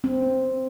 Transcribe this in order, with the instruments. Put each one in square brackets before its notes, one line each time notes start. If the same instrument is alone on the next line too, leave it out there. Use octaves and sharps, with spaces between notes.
[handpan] C4